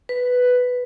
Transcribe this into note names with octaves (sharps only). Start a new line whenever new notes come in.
B4